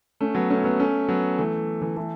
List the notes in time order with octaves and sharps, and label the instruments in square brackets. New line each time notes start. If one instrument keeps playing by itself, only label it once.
[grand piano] A3 C#4
F#3 B3
A3 C#4
F#3 B3
A3 C#4
F#3 B3
E3 A3
E3
E3 A3